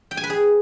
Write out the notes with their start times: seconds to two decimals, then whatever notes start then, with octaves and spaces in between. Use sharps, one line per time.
0.11 G5
0.17 G#5
0.24 B4
0.30 G#4